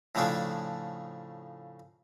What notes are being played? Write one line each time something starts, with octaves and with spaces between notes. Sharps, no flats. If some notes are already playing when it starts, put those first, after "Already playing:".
A2 C#3 F3 A3 D4 G#4